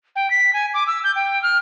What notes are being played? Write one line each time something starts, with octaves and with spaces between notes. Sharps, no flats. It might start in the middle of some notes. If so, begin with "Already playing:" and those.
G5
B6
G#5
D6
E6
G6
G5
F6